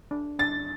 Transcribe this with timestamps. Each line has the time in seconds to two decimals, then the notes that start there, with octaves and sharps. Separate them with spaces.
0.11 D4
0.39 D4 A6